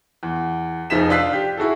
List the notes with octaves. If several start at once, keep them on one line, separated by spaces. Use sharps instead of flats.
E2
F1 F3 D#4 G#4 B6 E7
D4 F4 E6 F#6 B6 C7
G4
E4 F#4 G#4 A4